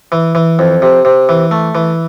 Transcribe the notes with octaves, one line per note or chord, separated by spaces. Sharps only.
E3
E3
F2
C3
C3
E3
A3
E3